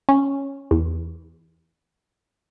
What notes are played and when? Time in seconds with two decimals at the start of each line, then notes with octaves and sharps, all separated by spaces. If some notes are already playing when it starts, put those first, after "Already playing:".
0.09 C#4
0.71 E2